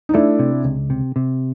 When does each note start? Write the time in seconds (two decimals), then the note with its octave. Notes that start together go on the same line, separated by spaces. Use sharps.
0.09 D#4
0.14 A3 D4 E4
0.39 C3
0.65 C#2
0.90 C3
1.16 C3